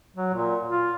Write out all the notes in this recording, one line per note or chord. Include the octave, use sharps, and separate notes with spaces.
F#3
A#2
F4